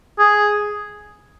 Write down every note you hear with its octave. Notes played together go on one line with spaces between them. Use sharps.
G#4